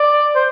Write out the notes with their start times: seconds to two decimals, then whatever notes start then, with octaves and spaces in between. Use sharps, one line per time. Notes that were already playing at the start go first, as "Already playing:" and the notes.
Already playing: D5
0.35 C5